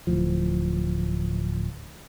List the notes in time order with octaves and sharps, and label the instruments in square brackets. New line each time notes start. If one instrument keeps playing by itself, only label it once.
[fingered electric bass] D1 A#1 A2 F3